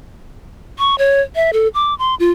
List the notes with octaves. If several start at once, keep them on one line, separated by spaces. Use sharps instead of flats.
C#6
C#5
E5
A4
D6
C6
F4